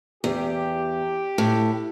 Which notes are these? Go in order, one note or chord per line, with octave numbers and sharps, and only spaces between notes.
E2 G4
A2